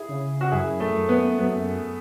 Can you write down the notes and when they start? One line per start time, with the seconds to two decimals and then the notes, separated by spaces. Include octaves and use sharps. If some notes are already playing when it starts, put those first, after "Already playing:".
Already playing: E4 G#4
0.09 C#3
0.41 F#4
0.52 F#2 E4 G#4
0.80 A3
0.95 F#2
1.09 B3
1.38 F#2 B3